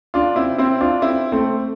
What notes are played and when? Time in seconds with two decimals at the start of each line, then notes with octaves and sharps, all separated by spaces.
0.14 D4 F4
0.36 C4 E4
0.58 C4 E4
0.81 D4 F4
1.02 C4 E4
1.32 A3 C4